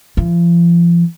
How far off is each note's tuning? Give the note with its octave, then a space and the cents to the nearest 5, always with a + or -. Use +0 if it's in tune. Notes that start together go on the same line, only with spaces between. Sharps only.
F3 -35